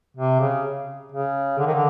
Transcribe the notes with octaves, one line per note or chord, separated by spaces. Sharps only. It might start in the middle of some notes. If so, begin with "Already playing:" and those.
C3
C#3
C#3
D3
D#3
D3